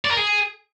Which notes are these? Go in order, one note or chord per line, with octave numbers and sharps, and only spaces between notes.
D5
A#4
G#4